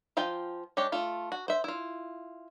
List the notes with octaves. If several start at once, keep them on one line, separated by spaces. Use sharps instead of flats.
F3 F4 G5 G#5
G#3 D4 G4 C#5
A3 F4
F#4
C5 E5
E4 F4